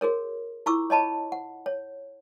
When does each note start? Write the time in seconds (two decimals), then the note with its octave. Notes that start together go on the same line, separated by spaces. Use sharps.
0.01 F#4 G#4 A#4 C#5
0.66 E4 F4 A#5 C#6 D6 E6
0.90 C#5 D#5 A5 B5
1.32 F#5
1.66 C#5